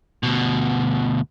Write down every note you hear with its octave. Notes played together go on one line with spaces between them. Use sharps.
D2 B2